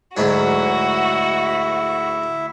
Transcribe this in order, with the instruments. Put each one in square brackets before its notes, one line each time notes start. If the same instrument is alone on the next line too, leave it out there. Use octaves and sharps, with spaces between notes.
[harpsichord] D2 G#2 F#3 [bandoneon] E4 E5 [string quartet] F#4